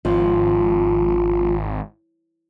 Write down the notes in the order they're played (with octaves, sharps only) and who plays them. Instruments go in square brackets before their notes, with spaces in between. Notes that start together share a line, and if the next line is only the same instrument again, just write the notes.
[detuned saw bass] G#1 [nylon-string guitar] F3